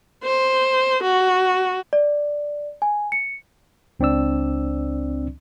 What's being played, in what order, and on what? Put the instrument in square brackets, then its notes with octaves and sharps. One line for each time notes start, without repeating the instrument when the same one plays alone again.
[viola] C5
F#4
[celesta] D5
G#5
C#7
[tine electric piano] C#2 C4 D4 D5 E6